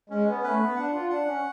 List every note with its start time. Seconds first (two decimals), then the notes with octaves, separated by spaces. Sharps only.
0.10 G#3 C#4
0.26 B3
0.43 A3 B4
0.60 B3
0.76 D4 F#5
0.93 F4
1.09 D4 F#5
1.26 C#4